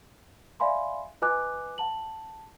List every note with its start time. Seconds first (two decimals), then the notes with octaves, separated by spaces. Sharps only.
0.60 D5 E5 F5 G#5 B5 C6
1.22 F4 B4 D#5 G#5 D6 F#6
1.78 F#5 A5 F#7